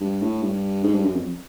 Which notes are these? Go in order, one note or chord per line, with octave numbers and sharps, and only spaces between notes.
G2
A2
G2
G#2
G2
F#2
F2